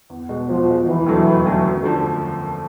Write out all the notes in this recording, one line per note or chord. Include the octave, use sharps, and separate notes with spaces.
E2
B2 G#3
E2 F3
B2 G#3
E1 E3
D#2 D3 F#3 A3
E1
D#2 D3 F#3 A3
F#2
D3 F3 A3